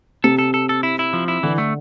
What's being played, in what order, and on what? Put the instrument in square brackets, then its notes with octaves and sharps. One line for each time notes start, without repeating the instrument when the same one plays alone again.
[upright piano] C3 [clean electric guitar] A4
[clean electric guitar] A4
A4
A4
E4
E4
F3
E4
[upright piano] D3 [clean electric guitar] E3
[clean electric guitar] A3